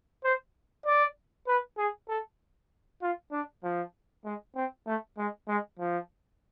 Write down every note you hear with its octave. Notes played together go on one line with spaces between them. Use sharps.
C5
D5
B4
G#4
A4
F4
D4
F3
G#3
C4
A3
G#3
G#3
F3